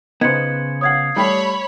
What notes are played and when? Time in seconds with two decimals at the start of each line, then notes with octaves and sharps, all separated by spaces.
0.21 C#3 B3 D#4 B4 C5 G#6 C#7
0.81 C#5 F5 F#5 D#6 G#6 C7
1.16 G3 A3 G4 C#5 B5